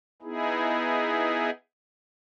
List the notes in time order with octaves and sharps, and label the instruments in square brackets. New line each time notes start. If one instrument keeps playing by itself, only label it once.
[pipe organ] B3 D#4 E4 G#4